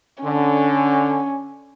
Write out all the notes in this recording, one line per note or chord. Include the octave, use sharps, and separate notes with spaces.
D3 C#4